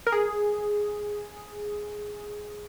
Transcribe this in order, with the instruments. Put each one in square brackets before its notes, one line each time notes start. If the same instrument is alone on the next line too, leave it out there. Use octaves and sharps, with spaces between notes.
[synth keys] A#4
G#4